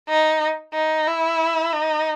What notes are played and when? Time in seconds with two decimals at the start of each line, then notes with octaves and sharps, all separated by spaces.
0.09 D#4
0.74 D#4
1.08 E4
1.73 D#4